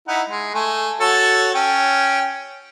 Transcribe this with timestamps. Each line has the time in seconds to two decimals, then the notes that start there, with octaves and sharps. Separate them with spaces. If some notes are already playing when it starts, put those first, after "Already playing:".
0.08 D#4 E4 F#5
0.30 G#3
0.54 A3 G#5
1.00 F#4 A4 C#5
1.55 C#4 G5